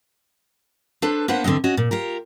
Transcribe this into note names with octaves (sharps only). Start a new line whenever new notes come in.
D4 A4 B4 C5
A#3 B3 D4 B4 C5 F#5
E2 D3 D#3 C4 D#5
C#4 F#4 D#5
A#2
F4 G4 A#4